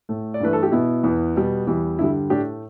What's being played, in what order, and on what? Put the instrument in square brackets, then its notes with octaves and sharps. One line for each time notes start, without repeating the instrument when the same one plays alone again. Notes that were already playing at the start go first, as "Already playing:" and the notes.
[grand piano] A2 A3
D5
G2 E3 A3 B4
A4
G4
B2 B3 E4
E2 E3 B3
B2 G3 B3
E2 E3 G3
G2 D3 G3 E4
A2 A3 D4 G4